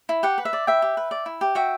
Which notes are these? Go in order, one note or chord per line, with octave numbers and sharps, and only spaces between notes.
E4
G4 F#5
B4
E5
D5
E4 E5 G5
G4
B4
D5
E4
G4
F#4 E5 G5